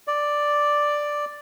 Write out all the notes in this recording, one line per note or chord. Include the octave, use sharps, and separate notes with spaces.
D5